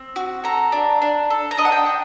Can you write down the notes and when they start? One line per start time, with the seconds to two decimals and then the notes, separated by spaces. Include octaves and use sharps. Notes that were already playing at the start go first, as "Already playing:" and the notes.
Already playing: C4
0.16 F#4
0.44 A4 A#5
0.72 D4
1.02 D4
1.30 A4
1.51 A#5
1.57 D4 D#5
1.65 F#5
1.72 G5
1.86 D4